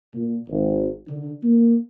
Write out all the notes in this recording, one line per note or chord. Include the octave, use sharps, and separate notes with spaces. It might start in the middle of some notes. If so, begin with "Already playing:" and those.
A#2
G#1
D3
A#3